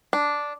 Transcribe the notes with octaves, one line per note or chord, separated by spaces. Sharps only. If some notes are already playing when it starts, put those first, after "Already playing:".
D4